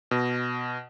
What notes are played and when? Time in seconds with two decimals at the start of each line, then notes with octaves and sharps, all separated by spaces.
0.11 B2